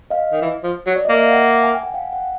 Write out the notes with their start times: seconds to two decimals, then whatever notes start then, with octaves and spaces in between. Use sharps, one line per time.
0.10 D#5 F5
0.32 D#3
0.42 E3
0.64 F3
0.87 F#3
0.96 D5
1.05 A#3 D#5
1.15 E5
1.23 F5
1.32 E5 F#5
1.63 G#5
1.74 G5
1.83 F#5 G#5
1.94 F5 G5
2.13 F#5